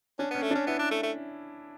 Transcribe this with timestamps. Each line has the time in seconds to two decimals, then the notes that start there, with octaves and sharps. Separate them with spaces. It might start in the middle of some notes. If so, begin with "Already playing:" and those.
0.19 C#4 D4
0.31 B3
0.35 C#4
0.43 A3
0.51 C#4 D4
0.67 B3 E4
0.79 D4
0.91 A3
1.03 A3